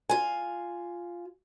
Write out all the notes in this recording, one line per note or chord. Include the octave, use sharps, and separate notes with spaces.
F4 G#5